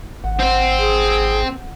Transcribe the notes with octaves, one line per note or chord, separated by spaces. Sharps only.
G#1 F#5
C4 C5
G#4